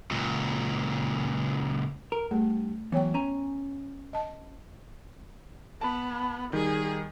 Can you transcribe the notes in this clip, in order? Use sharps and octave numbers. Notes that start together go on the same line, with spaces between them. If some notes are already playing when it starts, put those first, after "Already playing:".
C#2 A#2
A#4
G2 A3
E3 F#3 B3 C#5 G5
C#4 G#5 A#5
D#5 A5
B3 A5 B5
D#3 G3 G#4